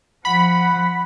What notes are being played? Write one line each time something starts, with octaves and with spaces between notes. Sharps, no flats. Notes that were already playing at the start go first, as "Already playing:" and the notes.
F3 F#5 B5